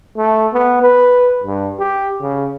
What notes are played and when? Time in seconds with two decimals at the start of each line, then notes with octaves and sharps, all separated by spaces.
0.17 A3
0.53 B3
0.82 B4
1.44 G2
1.79 G4
2.21 C#3